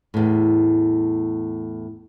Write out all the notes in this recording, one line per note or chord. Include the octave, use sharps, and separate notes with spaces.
E2 A2